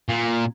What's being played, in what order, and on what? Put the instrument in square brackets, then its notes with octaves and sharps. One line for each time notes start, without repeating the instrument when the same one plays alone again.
[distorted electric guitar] A#2